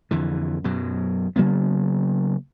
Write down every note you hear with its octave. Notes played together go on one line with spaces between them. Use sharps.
F2 D3 E3
F#2 B2 F#3
C#3 F#3 A#3 B3